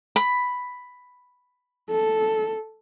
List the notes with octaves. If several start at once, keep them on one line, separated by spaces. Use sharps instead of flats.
B5
A4